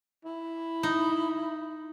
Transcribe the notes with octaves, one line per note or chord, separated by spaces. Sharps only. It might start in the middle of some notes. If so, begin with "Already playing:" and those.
E4
D#4